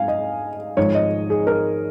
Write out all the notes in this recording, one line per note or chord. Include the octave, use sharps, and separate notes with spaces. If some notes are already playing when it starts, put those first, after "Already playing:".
Already playing: G#2 F5 G#5
D#5
G#1 G#2 F3 C#5
D#5
G#4
A#4